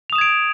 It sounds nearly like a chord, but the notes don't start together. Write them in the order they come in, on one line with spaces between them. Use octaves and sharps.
F7 D#6 E7 G#6 D7